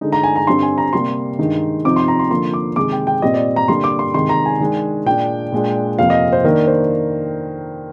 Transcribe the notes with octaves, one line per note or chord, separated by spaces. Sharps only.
D3 G#3 D#4
A#5
G#5
A#5
G2 D3 G3 C4 C6
G#5
A#5
C3 G3 A#3 C6
G2 D#3 G#3 D#4
C3 F3 C4 D#4 D6
C6
A#5
C6
D3 F3 A#3 D#4 C6
D6
C3 D#3 G#3 D6
G5
G5
A#2 G3 C4 D#5
D5
A#5
D3 G3 A#3 C6
D6
C6
C3 D#3 G#3 D#4 C6
A#5
G#5
D#3 G#3 D4
A#2 G#3 D4 G5
A#2 G#3 D4
F2 C3 F3 A#3 F5
D#5
C5
D#3 A#3 D4 A#4
C5